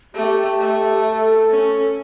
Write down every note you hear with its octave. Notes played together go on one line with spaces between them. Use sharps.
A3 G4
A3
A4
C#4